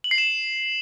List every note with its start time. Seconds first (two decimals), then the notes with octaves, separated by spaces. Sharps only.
0.04 F#7
0.11 C7
0.18 E7